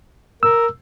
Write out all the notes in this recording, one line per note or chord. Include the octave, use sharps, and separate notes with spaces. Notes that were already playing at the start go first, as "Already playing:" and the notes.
A#4 E6